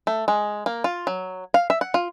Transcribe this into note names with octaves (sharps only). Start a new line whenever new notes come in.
A3
G#3
A#3
F4
F#3
F5
E5
F#5
F4